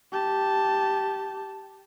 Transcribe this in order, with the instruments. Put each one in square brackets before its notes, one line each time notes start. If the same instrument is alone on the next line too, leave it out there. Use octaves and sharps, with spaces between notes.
[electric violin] G4 A5